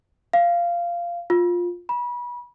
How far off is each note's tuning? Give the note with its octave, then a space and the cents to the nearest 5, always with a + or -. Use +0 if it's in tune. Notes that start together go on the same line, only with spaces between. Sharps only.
F5 -15
F4 +10
B5 -30